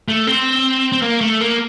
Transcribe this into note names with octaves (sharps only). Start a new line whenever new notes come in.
A3
C4
C4
A#3
A3
A#3